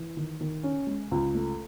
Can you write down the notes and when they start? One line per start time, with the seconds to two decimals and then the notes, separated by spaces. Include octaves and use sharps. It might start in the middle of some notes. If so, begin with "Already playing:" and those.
Already playing: E3
0.17 D#3
0.41 D#3
0.63 C#4
0.87 G#3
1.11 C#2
1.35 A3